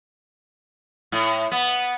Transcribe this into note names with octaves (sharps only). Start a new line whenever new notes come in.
A2
B3